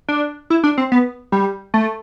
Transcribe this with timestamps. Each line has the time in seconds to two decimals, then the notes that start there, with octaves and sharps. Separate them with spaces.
0.08 D4
0.50 E4
0.63 D4
0.78 C4
0.92 B3
1.32 G3
1.74 A3